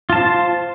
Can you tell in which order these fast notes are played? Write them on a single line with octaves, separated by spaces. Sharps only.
F4 A5 C5